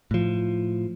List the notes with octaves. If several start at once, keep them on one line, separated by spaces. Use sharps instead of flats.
A2 F3